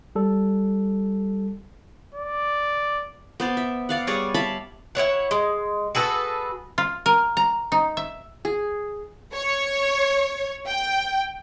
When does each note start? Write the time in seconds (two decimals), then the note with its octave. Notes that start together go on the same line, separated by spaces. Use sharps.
0.15 G3 A4
2.14 D5
3.40 B3 C5 D5
3.57 E5
3.89 D5 F5 F#5
4.07 G3 G#4 C#5 D5
4.34 E5 F5 A5 B5
4.95 E4 F4 C#5 F#5
5.31 G#3
5.95 F#4 G#4 A4 B4
6.78 F4
7.06 A#4
7.37 A#5
7.72 D#4
7.97 E5
8.45 G#4
9.33 C#5
10.67 G5